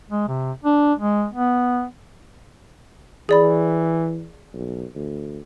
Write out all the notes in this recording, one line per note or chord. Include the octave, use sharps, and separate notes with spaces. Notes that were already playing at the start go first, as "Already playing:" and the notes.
G#3
C3
D4
G#3
B3
E3 G#4 D5 B5
B1
D2